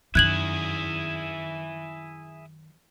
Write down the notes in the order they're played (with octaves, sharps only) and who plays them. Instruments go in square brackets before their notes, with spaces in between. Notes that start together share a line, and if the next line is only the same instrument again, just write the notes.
[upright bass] F#2 D#3 [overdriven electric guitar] E4 G#4 [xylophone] F#6 G#6 F#7